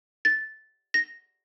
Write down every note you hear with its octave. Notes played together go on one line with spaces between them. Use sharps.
A6
A#6